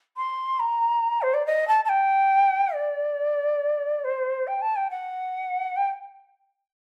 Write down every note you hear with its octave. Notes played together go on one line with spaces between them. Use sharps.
C6
A#5
C5
D5
D#5
A5
A5
G5
D5
C5
G5
A5
G5
F#5
G5